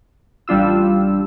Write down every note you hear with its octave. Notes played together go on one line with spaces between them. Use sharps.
A1 G3 D4 F4 E6